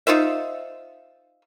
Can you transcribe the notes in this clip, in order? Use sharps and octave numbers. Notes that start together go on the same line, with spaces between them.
D#4 F4 C5 E5